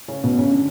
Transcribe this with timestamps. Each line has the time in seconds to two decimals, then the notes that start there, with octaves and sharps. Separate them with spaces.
0.08 C#3 C#4
0.24 B2 B3
0.39 C#3 C#4
0.51 D3 D4